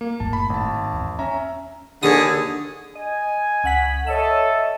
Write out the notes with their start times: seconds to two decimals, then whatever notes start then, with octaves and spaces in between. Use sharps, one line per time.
0.01 A#3
0.20 F#1 A2 A5
0.33 B5
0.50 G#1 A5
0.93 E2
1.19 C#4 E5 A#5
2.03 D#2 D3 G#4 D#6
2.95 D#5 G#5
3.64 C#2 F#5 B6
4.07 A4 C#5 D#5 E5